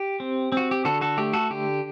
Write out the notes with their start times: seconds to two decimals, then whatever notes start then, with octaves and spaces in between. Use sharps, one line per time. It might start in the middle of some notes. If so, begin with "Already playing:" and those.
Already playing: G4
0.20 C4
0.52 C4 F#4
0.71 G4
0.85 D3 F#4 A4
1.01 F#4 A4
1.17 A3 G4
1.33 F#4 A4
1.50 D3 G4